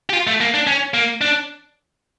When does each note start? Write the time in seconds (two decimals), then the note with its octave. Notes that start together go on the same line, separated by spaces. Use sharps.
0.10 G4
0.13 F4
0.27 A3
0.40 A#3
0.54 D4
0.67 C#4
0.94 A#3
1.21 D4